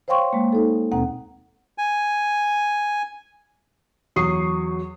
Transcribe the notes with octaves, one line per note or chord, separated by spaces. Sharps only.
C5 C#5 F5 G5 C6 C#6
G#3 A#3
D#4 A4
D#2 B2 C4 F#5 A#5
G#5
E2 F#3 C#6 D#6 C7